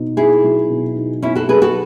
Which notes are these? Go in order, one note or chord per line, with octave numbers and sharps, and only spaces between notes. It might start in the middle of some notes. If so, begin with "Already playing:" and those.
Already playing: B2 D#4
B3 E4 G#4
F#3
B2
D#4
B3 C#4 E4
F#4 A4
F#3 G#4 B4
F#4 A4